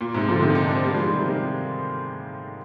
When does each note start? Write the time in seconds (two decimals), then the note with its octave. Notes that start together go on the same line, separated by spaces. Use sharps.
0.01 A#2
0.14 G#2 C3
0.29 D3 F3
0.42 C3 D#3
0.55 D#4
0.65 D4
0.75 C4
0.83 G3 A#3
0.94 F3 G#3
1.04 D#3 G3
1.15 C3 D#3
1.25 C3 D#3